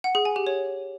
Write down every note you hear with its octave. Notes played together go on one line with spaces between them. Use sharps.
F#5
G#4
G#5
G4
C#5